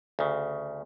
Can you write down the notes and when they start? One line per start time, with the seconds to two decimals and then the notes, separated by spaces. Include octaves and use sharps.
0.19 D2 C#3